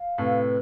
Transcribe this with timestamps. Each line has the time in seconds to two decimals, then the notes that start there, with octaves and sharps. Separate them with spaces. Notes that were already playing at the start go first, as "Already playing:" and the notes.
Already playing: F5
0.18 A2 C3 B4